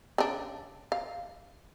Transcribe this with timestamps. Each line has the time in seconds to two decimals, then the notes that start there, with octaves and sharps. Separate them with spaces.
0.18 C#3 D4
0.92 F5